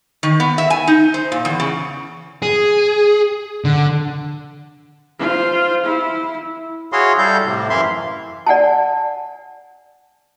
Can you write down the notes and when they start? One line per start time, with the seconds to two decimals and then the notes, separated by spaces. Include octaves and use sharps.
0.23 D#3
0.40 B3
0.58 E5
0.70 G#5
0.87 D#4
1.14 C5
1.32 A#2
1.45 E2
1.60 C#3
2.42 G#4
3.65 D3
5.19 F4 C5
5.84 E4
6.92 E4 F#4 G#4 C#5 F5 C6
7.18 G3 E4 A4 F5 G6
7.46 A2 C3
7.70 F#2 E3 E4 E5 F5 C6
8.47 D5 F#5 G#5 A5